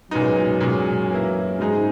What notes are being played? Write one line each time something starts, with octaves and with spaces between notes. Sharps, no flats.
F#2 A#2 G#3 B3 D#4
A#2 G#3 C#4 G#4
E3 A#3 E4
G#2 C#3 G#3 D#4 G#4